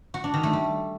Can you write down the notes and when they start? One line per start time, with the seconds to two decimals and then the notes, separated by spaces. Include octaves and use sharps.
0.14 F#4
0.24 D4
0.34 D#3
0.43 A3
0.53 G3